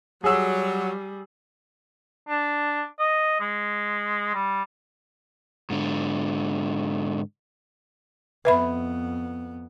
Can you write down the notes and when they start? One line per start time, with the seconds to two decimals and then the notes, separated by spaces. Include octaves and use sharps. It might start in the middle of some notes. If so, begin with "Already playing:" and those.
0.24 F#3 G3 G#4 E6
2.29 D4
2.99 D#5
3.40 G#3
4.35 G3
5.70 G#2 D3
8.45 F2 B3 B4 E5 B5